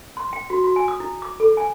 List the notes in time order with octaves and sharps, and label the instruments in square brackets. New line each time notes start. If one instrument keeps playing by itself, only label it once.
[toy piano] C6
G5
F#4
F#4
G#5
D#6
E4
D6
A4
G#5